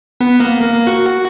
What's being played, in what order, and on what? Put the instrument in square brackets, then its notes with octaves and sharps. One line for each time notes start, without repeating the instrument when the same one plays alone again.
[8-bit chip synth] B3
A#3
A#3
A#3
F#4